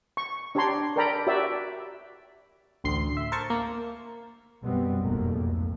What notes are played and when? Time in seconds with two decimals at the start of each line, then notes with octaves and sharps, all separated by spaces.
0.17 C#6
0.55 D4 G4 C#5 D5 A#5 C6
0.96 A4 A#4 D5 G5 A#5 B5
1.27 F#4 G4 C#5 D5 E5
2.84 A1 D2 C6 C7
3.17 E5
3.32 A#4 C5 A5 C#6
3.50 A#3
4.62 F#2 B2 G3 B3 C4
5.01 F1 B1 F2 G#2 A3 A#3
5.41 F2